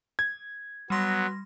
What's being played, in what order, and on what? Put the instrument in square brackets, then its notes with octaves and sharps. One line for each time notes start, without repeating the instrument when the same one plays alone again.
[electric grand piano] G#6
[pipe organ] F#3 B3 [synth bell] G3 C6 A#6